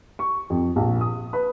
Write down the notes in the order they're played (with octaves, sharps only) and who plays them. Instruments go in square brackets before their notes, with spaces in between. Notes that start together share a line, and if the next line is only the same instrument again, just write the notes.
[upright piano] C#6
F2
A#1
D#6
B4